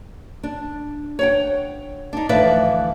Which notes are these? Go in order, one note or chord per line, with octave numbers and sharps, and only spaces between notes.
D4
C#5 F#5 G5
D4 D#4
D2 E3 F3 B4 D5 E5